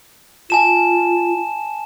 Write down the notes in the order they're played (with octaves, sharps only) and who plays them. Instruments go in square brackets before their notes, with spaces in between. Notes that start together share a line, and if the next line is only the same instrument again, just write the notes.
[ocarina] F4 [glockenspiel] G#5 A5 E7